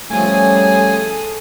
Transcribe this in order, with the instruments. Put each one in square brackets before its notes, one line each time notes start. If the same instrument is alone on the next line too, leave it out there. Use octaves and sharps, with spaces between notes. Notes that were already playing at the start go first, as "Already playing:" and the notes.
[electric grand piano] F3 A3 [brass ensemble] G3 C#4 [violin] G#4 A4 [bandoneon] G#5